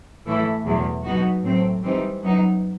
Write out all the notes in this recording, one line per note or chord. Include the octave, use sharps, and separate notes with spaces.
A2 E3 A3 E4 A4
E2 B2 F#3
B2 F#3 B3 D#4 F#4
A2 F#3 A3 C4
E3 G3 C4 D#4
F#2 F#3 B3 D#4